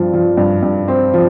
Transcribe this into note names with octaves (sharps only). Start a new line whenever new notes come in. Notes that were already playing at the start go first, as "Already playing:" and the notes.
Already playing: G2 F3 C4
F3
G2
G2
C4
F3